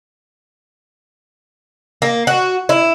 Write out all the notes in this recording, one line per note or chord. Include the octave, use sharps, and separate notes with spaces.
A#3
F#4
E4